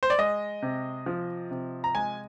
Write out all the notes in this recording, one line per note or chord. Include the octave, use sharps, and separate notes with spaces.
C5
D5
G#3 D#5
C3
F3
C3
A#5
G#3 G#5